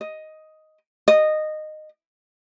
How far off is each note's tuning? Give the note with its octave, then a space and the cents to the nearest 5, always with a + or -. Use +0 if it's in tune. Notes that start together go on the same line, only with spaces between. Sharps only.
D#5 +5
D#5 -15